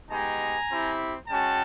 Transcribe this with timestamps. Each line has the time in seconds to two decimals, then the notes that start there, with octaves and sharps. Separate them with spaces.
0.10 G#3 B3 D#4 G4 G#5 A#5
0.69 C4 E4 G4
1.28 G#3 C#4 F#4 G5 A5